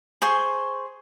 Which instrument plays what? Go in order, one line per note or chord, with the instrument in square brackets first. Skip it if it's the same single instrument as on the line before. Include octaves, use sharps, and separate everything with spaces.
[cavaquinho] G#4 C5 C6 C#6